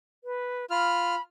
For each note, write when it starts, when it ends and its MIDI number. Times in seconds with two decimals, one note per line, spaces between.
0.24 0.65 71
0.70 1.15 65
0.70 1.21 83
0.70 1.15 89